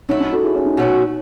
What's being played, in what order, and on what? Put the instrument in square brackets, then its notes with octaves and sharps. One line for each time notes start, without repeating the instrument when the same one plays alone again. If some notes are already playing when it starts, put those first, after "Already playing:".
[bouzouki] F#3 A3 E4 [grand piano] D#4
[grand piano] D#4
F#4 A4
E4 G#4
C#4 E4
D#4
[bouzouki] B2 A3 C#4 F#4